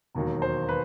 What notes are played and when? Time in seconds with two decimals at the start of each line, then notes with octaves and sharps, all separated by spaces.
0.15 E1 D#2 D#3 F#3
0.42 C5
0.69 B4